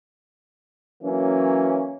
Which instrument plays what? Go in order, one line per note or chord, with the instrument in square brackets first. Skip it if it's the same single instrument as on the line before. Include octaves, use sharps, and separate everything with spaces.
[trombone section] E3 F#3 A#3 C#4